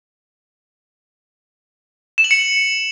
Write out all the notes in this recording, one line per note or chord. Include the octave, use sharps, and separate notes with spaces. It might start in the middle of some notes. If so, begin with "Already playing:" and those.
E7
F#7
C#7